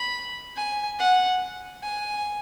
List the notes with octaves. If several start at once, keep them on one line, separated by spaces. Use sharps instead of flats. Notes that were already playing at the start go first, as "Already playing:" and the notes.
Already playing: B5
G#5
F#5
G#5